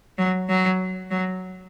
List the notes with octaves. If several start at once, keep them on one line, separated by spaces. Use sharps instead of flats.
F#3
F#3
F#3